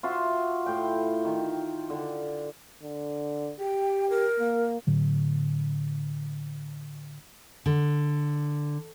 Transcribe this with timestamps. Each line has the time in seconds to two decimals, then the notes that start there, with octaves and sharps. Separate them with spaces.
0.03 F4 F#4 E5 C6
0.66 A2 G5
1.25 D#3
1.90 D3
2.83 D3
3.60 G4 G5
4.10 A#4
4.40 A#3
4.87 A2 D3 F#3
7.66 D3